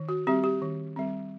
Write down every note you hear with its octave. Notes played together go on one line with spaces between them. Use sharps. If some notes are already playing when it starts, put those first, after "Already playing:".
Already playing: D#3
F#4
G3 C4 G4
G4
D#3
G3 C4